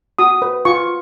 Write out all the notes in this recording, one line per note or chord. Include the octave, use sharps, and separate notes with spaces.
F#4 D#6
B4
F4 C#6